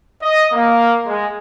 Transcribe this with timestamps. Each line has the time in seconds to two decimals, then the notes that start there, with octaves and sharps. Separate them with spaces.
0.21 D#5
0.53 A#3
1.06 G#3